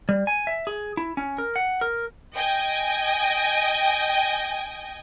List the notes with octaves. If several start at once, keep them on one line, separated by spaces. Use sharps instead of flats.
G3
G#5
E5
G#4
E4
C#4
A#4
F#5
A#4
D#5 G5 G#5